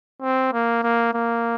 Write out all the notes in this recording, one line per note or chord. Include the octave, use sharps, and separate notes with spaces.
C4
A#3
A#3
A#3